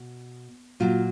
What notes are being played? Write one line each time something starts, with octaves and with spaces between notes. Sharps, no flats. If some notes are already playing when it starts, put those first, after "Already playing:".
Already playing: B2
A#2 F#3 F4